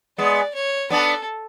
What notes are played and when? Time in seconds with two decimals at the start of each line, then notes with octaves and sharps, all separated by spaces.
0.18 G#3 B3 D5
0.55 C#5
0.90 B3 D4 A4